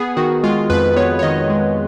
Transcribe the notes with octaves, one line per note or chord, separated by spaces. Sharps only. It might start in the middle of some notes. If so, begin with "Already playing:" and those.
Already playing: B3 G#4
D#3 F#4
G#3 F4
F2 B4
B3 C#5
C#5
D#3 D#5
G#3